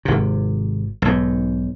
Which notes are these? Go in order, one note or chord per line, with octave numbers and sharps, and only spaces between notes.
G#1 C3
B1 G#2